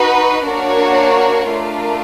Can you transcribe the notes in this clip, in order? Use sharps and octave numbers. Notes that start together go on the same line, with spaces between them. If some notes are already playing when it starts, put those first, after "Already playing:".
Already playing: D#4 F#4 B4
A#3 D4 F#4 A#4 C#5
A3 D4 F4 A#4